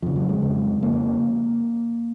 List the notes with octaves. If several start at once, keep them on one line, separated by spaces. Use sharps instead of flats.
F2 C#3 F3
F#3
G#3
F2 C#3
F2 C#3 A#3